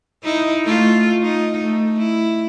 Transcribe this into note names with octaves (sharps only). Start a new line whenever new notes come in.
D#4 E4
A3 F4
D#4
A3
E4